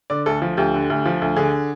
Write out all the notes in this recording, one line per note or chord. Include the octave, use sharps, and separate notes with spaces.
D3 D5
D2 A4
F3
D2 G4
D3
D2
F3
D2
D3 G#4